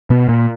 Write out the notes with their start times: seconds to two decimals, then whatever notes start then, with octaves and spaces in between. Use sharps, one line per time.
0.10 B2 B3
0.29 A#2 A#3